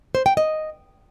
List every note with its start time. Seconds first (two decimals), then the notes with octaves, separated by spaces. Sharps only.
0.15 C5
0.26 G5
0.37 D#5